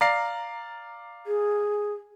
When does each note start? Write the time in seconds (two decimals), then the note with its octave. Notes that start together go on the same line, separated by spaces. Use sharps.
0.01 D5 F5 A#5 C7
1.27 G#4